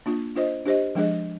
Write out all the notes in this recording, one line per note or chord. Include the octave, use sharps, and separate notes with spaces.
A#3 D4 F4
D4 F4 C5 D#5
D4 G4 C5 D#5
F3 G#3 D4 G#4 D#5